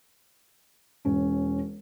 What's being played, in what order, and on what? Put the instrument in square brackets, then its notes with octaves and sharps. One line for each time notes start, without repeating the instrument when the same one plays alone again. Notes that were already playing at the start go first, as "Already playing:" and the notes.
[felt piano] E1 C#4